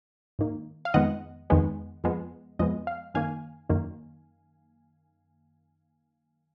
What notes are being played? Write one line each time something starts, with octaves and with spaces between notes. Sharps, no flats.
G#2 D#3 A#3
F5
F2 D#3 G#3 B3 D#5 F#5
F2 D#3 G#3 B3
F2 F3 G#3 B3
F2 F3 G#3 B3 D#5
F5
F#2 D#3 A#3 F5 G#5
F#2 D#3 A#3